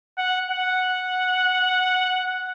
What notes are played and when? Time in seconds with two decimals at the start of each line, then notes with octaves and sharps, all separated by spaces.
0.18 F#5
0.51 F#5